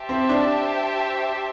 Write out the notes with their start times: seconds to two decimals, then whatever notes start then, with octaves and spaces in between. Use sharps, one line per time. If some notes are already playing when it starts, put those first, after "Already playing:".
Already playing: G4 C5 E5 A5
0.09 C4
0.29 D4